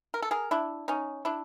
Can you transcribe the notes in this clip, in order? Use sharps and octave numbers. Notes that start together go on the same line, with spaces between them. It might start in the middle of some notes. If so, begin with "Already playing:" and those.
A#4
A4
G#4 A#4
D4 E4
C#4 D#4
D4 E4